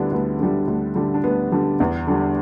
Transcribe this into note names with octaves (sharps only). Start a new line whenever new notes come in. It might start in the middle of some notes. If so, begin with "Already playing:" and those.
Already playing: D2 D3 G3 B3 D4 E4
D2 B3
D3 G3
D2
D3 G3
D4
D2 B3
D3 G3
E2
D3 G3